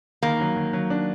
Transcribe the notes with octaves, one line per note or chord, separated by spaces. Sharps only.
D#3 A#3
F#3
F#3
F#3
D4